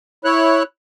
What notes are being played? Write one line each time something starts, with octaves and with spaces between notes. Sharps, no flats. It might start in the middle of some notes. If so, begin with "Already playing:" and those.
E4 C#5 F#6